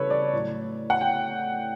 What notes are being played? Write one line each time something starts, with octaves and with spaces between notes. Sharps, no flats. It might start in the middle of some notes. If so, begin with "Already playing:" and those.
Already playing: C#3 E3 G3 A4 B4 C#5
D5
A2 F#3
F#5
G5